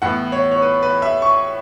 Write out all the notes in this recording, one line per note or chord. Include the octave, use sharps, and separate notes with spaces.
A2 E3 B3 F#5
C#5
C#5
B4
B4
E5
C#6